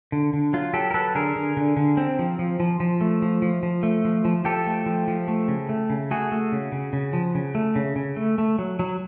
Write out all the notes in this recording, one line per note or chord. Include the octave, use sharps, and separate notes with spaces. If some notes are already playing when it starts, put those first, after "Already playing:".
D3
D3
F#3 F4
F#3 G4 A4
A#4
F#3 A4 B4
D3 G#4 A#4
D3
D3
D3
C4
F3
F3
F3
F3
A3
F3
F3
F3
A3
F3
F3
F3 G4 A4
A3
F3
F3
A3
C#3
A3
C#3
A3 F#4 G#4
A3
C#3
C#3
C#3
F3
C#3
A3
C#3
C#3
A3
A3
F#3
F#3